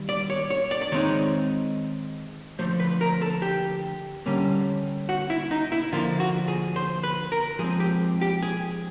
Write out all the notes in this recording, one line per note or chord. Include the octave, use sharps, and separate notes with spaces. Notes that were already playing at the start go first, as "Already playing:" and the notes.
Already playing: D#3 G3
D5
C#5
C#5
D5
D5
D#3 G#3 C4 D#4 C#5
D3 F3 A3 C5
B4
A#4
A4
G4
D3 G3 A#3 C#4
F#4
E4
D#4
E4
D3 F3 A#3 F4
F#4
G#4
C5
B4
A#4
F3 G#3 C4 G#4
G4
G4
G#4